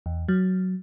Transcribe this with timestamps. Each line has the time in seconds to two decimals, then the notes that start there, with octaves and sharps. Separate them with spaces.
0.06 E2
0.28 F#3